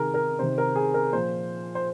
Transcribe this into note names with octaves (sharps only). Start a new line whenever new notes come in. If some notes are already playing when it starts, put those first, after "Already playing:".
Already playing: C3 D#3 G#4 A#4
A#4
C3 D#3 C5
A#4
G#4
A#4
A#2 F3 C5
C5